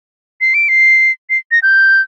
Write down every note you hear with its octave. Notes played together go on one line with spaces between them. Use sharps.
C7
D7
C7
C7
A#6
G6